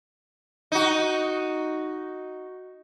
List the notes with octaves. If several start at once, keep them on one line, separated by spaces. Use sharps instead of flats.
D#4 F#4